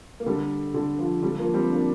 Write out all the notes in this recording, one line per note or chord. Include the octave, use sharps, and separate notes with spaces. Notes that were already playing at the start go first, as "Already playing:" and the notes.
A#3
D3 G3
D3
F3
D3 G3
F3 A#3
G3 C4
A#3 D4